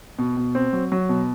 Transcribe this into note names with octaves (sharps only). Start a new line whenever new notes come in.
B2
B2
C4
F#3
F#3
B2